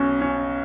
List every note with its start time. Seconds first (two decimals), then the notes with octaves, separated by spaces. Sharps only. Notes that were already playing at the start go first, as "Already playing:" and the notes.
Already playing: B1 C#4
0.22 C#4